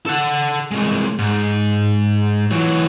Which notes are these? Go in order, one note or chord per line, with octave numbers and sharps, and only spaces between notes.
A4 F#5
C2 G#3
G#2
E3 F#3